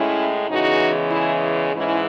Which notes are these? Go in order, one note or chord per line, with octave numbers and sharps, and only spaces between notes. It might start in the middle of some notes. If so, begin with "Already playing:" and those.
Already playing: A2 G#3 C#4 E4
E2 C#3 E3 G#3 D#4 F#4
E4 G#4
G#2 E3 G#3 C#4 E4